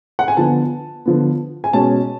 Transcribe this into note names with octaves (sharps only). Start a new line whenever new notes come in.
F#5
G#5
D3 F3 B3 A5
D3 F3 B3
G#5
B2 G#3 C#4 A5